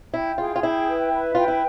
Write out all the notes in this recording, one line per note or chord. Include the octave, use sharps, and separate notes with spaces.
E4 G5
F4 G#4
F4
E4 G5
B4
B4
F4 G5
E4